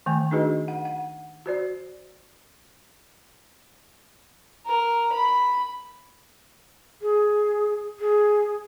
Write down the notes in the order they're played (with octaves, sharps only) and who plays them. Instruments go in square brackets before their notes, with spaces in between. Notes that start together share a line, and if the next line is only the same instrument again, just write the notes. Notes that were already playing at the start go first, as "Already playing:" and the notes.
[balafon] D#3 A3 G#5
D4 D#4 F#4 G#4 B4 D#5
F#5
F#5
F#4 C5 D5
[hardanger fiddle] A#4
B5
[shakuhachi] G#4
G#4